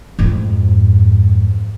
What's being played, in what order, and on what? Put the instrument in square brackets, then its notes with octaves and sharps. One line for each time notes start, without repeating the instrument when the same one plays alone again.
[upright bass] F2 G#2